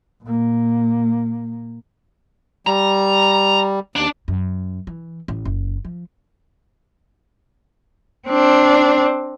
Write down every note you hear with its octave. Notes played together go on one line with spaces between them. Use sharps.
A#2 A#3
G3 A#5
D#2 D4
F#2
E3
A1
F#1
F3
C4 D4